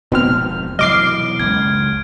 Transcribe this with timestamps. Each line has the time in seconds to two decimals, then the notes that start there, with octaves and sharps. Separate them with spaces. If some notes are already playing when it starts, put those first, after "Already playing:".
0.12 F1 G#2 B2 D#3 C4 F6
0.79 B2 E3 F#3 D#5 D6 F6 C7 D7
1.40 F#1 C#2 G#6